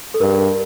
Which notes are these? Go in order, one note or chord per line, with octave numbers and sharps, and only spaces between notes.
A4
G2 A#4